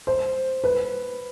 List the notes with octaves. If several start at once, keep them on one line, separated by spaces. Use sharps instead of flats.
C5
B4